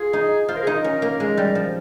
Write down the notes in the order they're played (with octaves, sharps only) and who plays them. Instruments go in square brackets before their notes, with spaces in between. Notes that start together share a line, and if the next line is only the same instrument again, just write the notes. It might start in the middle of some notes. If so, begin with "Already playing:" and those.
Already playing: [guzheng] F4 [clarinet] G#4
[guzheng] D#4
[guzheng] F4 [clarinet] C5
[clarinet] A#4
G#4
[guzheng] D#4 [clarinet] A#4
[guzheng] C#4
A#3
G#3
G3
F3